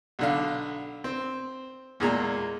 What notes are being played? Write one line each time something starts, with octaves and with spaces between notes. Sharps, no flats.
B1 D3 F5
C4
E2 A#2 G#3 A#5